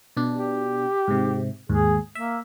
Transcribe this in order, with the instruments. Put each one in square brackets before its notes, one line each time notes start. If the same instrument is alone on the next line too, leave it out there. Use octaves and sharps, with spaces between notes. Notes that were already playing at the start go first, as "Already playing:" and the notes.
[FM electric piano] B2 D4
[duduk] G4
[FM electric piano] G#2 C3
[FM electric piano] D#2 G#2 [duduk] G#4
[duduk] A#3 [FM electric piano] E5